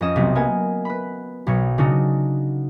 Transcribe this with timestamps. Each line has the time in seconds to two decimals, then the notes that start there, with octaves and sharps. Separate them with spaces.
0.01 F2 C#4 D#5 E7
0.16 B1 C3 A3 B3 C4
0.35 A#3 B3 G#5
0.85 B4 B5
1.47 B1 B2 C#5 C#7
1.78 C#3 D4 D#4 F#4